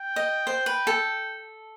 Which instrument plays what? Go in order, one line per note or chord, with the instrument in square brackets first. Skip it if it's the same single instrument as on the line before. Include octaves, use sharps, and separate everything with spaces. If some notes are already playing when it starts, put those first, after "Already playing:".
Already playing: [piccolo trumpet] G5
[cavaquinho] D#5
C5
B4
A4